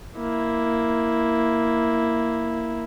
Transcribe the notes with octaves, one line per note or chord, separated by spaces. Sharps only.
A#3 E4